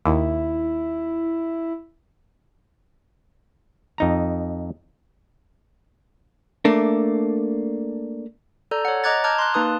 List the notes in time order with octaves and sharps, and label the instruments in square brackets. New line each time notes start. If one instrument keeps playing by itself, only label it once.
[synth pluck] D#2 [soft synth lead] E4
[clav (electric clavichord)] F2 D#4 A#5
[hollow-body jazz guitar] A3 A#3 D4
[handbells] A4 D5 A#5 G6
C#5 F#5
D#5 A#5 D6 F#6 G#6 A6
A5 A#5 D6 F6 G6 G#6
C6 F#6
A#3 D#4 B4 A5 D#6